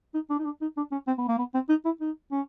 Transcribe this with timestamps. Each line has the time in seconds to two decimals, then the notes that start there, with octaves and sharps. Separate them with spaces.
0.14 D#4
0.30 D4
0.39 D#4
0.45 D4
0.61 D#4
0.77 D4
0.92 C#4
1.07 C4
1.18 B3
1.28 A#3
1.38 B3
1.54 C4
1.69 D#4
1.85 E4
2.01 D#4
2.32 C#4